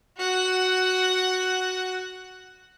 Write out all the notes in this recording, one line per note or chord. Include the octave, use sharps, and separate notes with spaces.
F#4 F#5